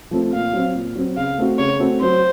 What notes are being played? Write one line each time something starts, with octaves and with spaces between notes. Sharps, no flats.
F3 A3 C4
A#2 F5
F#3 C4
A#2
F#3 C4
C#3 F5
A3 C4 F#4
C#3 C#5
A3 C4 F#4
F#3 C5